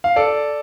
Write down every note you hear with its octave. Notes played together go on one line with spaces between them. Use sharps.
F5
A4 D5